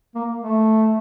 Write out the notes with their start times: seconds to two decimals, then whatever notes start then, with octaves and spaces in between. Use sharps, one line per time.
0.15 A#3
0.42 A3